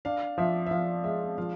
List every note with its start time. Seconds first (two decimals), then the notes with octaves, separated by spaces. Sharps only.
0.05 D4 F5
0.38 F3 E5
0.67 E5
0.71 F3 F5
1.04 G#3 E5
1.38 F3 F5